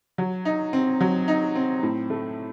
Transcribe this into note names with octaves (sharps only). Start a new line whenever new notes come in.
F#3
D#4
C4
F#3
D#4
C4
A2
A3